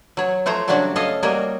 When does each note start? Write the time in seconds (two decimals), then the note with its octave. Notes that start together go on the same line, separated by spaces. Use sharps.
0.17 F#3 C#5
0.46 F3 A3 C5 C#5 A#5
0.68 C#3 F#3 G3 D4 F#4 C#5
0.96 A4 C#5 D#5 F5
1.23 G3 A#3 F#4 A#4 C#5 D#5